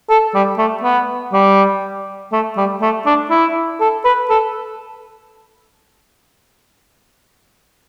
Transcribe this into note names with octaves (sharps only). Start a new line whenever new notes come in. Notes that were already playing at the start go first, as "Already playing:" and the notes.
A4
G3
A3
B3
G3
A3
G3
A3
D4
E4
A4
B4
A4